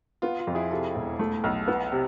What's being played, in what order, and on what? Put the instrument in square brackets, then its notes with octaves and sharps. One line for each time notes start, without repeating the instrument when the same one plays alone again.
[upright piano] B3 [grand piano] F4
[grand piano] F4
[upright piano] F2
[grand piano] E4 G#4
[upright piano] C3 [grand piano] F4 A4
[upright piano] E1
A3
B1
B3
C3